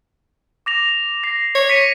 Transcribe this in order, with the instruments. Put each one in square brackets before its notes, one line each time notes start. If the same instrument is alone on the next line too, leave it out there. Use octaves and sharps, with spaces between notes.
[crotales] D6 A#6 F7
A#6 C7
[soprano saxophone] C#5
[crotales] B6 C#7 D#7